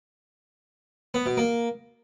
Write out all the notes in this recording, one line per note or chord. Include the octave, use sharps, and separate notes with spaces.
B3
B2
A#3